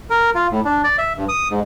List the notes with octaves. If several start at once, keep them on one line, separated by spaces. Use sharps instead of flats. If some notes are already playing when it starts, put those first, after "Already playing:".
A#4
F4
A2
D4
D5
E5
G2
D#6
G#2